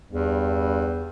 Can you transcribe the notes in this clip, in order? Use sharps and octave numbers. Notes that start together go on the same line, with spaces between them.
E2 G2